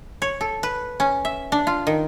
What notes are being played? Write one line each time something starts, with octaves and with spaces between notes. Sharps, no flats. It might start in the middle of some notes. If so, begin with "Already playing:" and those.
C#5
A4
B4
C#4
E5
D4
F4
D#3